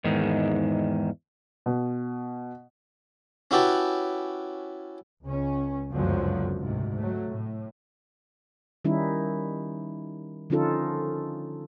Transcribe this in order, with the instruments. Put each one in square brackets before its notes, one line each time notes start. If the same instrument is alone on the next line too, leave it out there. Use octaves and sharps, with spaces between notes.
[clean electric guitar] E2 G#2 D#3
[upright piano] B2
[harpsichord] C#4 E4 F#4 G4 B4 A5
[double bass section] C#2 C#4
G1 C#2 F#2 D3 F3 F#3
D2 G#2 C3
F#3 A3
A2
[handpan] D#3 G3 C#4 D#4 E4
D3 F3 C#4 D#4 F4 A4